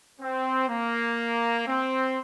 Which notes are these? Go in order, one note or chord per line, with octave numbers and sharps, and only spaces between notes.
C4
A#3
C4